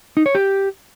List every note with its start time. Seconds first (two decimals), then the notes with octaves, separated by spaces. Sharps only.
0.17 D#4
0.26 C#5
0.35 G4